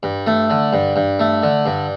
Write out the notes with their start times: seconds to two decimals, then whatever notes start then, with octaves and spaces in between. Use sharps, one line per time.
0.03 G2
0.27 A3
0.50 D3
0.73 G2
0.96 G2
1.19 A3
1.43 D3
1.66 G2